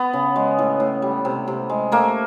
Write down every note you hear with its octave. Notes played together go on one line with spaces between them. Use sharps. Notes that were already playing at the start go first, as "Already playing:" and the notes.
Already playing: B3
C#3
G#3
A2
A2
G3
C3
C3
G#3
A3 A#3